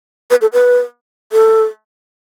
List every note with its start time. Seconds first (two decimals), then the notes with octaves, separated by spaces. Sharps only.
0.30 B4
0.41 A4
0.53 B4
1.32 A4